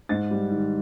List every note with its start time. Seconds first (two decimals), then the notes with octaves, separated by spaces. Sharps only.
0.09 G#2 A6
0.31 G3
0.51 D#3